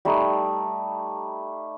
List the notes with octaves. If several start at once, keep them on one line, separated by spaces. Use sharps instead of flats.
G3 A3 D#4